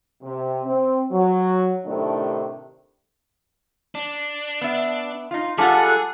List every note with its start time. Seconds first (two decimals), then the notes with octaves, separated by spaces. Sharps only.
0.22 C3
0.66 C4
1.12 F#3
1.86 A2 C3 D#3 A3 C4 D4
3.95 D4
4.61 B3 E5
5.31 D#4 F4
5.58 G3 G#3 F4 G#4 A4 F#5